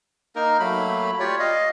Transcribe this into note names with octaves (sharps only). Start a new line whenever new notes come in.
A#3 D#4 A#4
F#3 A3 A#3 B5
F4 G4 C#5 D5
D#5 F5